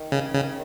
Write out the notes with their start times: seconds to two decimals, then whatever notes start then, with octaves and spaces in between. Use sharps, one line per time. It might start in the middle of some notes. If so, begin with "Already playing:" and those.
Already playing: D#3
0.12 C#3
0.34 C#3